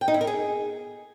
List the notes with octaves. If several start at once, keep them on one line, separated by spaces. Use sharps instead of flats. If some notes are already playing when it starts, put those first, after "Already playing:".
G5
D#4
E4
A#4
G#4